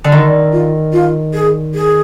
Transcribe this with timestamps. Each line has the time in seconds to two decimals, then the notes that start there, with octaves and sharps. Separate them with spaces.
0.04 D3
0.12 D#3 D5
0.53 F4
0.93 F4
1.34 G#4
1.75 G#4